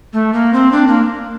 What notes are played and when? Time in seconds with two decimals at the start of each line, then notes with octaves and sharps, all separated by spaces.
0.13 A3
0.33 A#3
0.53 C4
0.72 D4
0.87 A#3